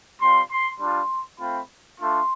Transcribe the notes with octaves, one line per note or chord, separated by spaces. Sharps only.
G3 C4 F4 C6
C6
G3 D4 F4 C6
A3 C4 F4 B5
A3 D4 F4 C6